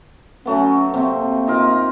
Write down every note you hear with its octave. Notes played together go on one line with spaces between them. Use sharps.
F#3 A3 B3 C#4
C3 A#3
D#4 F4 A#4